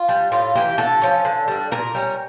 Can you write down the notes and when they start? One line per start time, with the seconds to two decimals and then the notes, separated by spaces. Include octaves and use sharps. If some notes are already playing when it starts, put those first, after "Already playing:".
Already playing: F4
0.08 G3 D4
0.32 A2 F4
0.55 E3 A#3 G4
0.78 D3 A4
1.02 F3 C#4
1.25 D3
1.48 G3 D4
1.71 A#2 A#4
1.95 G3 C#4